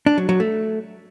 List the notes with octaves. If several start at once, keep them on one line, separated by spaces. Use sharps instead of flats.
D4
F#3
F#3
A3